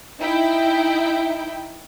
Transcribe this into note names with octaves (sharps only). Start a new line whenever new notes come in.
D#4 E4 G5